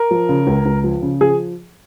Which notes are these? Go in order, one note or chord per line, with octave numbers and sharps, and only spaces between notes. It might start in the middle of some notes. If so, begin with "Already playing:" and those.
Already playing: A#4
F3
C#3
C#2
C#2
F3
C#3
F3 G#4